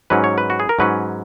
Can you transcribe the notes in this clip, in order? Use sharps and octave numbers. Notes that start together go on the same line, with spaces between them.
G#2 F#3 C#4 B4
C#5
B4
F#4
G#4
A#4
G#2 F#3 C#4 B4